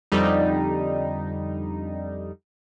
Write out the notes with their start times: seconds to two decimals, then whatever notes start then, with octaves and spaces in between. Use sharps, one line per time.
0.12 F2 D3 G3 D#4